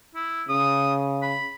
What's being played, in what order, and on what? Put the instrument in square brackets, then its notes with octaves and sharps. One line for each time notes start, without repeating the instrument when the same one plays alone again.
[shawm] E4
[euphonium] C#3 [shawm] D#6
[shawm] B5